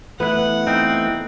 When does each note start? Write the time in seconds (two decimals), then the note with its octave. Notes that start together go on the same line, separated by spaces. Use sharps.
0.20 E3 A3 B3 E4 F#5
0.67 C4 D#4